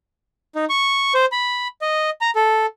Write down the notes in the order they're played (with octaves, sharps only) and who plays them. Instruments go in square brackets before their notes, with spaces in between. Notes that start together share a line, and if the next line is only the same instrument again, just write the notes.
[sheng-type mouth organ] D#4
C#6
C5
B5
D#5
A#5
A4